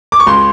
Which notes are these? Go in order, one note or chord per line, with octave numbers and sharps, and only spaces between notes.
D6
C#6
C#2 C6